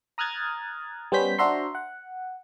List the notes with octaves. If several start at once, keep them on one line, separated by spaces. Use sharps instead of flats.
A#5 D#6 F6 F#6 G#6 A6
G3 B3 C#4 C5 G6 B6
D4 F#4 C5 E5 A#5 C6
F#5